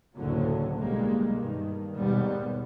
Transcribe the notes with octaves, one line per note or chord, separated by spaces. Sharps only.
F#1 D2 A2 D3 F#3
B1 G3 G#3 A#3
G2 D#3
D#2 G#2 B2 G3 B3